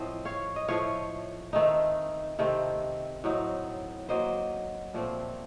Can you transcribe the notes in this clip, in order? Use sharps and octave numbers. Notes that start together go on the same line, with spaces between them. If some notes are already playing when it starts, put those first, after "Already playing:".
Already playing: A2 F3 C4 C5 D#5
C#5 F5
D#5
A2 F3 A3 C#5 F5
D#3 A3 C4 D#4
C3 D#3 A3 C4
A2 F#3 C4 D#4
D#3 F#3 A#3 C5 D#5
A#2 F3 A3 C4